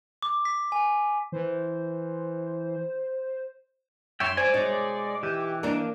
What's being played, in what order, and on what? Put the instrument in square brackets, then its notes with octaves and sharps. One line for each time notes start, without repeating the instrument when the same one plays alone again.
[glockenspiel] D6
B6
G#5
[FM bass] E3 [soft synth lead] C5
[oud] F#2 [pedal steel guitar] C#5 E5 G5 [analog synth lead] C6
[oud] C5 [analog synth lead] D5 [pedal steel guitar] G#5
[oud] B2 D#4 C#5 [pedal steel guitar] G#3
[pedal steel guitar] E3 [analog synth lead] G4
[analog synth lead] A#3 [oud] D4 D#4 A#4